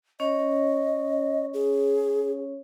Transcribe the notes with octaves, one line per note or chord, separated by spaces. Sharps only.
C#4 C#5 D#5
G#4